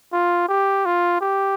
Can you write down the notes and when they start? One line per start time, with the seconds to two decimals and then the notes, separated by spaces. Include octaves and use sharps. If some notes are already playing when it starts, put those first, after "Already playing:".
0.13 F4
0.48 G4
0.86 F4
1.21 G4